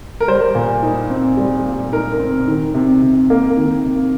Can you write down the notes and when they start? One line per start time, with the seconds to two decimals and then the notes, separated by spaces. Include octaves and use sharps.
0.20 A#4
0.28 G3 C5
0.55 A#2
0.83 D#4
1.10 C4
1.37 G3
1.65 A#2
1.92 D#4 A#4
2.19 C4
2.48 D#3
2.74 C3
3.02 C3
3.30 A#3
3.57 D#3
3.85 C3